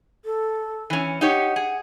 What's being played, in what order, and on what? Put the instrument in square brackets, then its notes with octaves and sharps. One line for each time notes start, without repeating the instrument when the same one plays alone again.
[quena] A4
[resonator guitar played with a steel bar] E3 C#4
[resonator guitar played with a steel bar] D#4 G4 C#5 [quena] F#5
[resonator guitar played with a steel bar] G#4